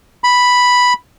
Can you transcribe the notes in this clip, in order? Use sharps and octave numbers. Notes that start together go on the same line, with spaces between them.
B5